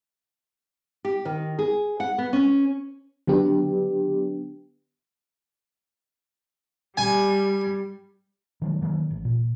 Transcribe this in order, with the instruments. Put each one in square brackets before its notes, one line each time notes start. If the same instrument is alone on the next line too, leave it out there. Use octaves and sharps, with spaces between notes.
[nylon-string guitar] G4
D#3
G#4
F#5
B3
C#4
[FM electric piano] D3 F#3 B3 D4 G4
[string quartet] G3 [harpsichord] G#5
[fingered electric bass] D#3 F#3 G#3
D#3 E3 F#3 A#3
A1
A#2